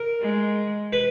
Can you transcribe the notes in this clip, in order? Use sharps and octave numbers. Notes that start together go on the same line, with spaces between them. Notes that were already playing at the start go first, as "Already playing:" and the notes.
Already playing: A#4
G#3
B4